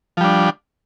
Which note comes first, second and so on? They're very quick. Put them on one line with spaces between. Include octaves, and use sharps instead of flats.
F3 G3 D4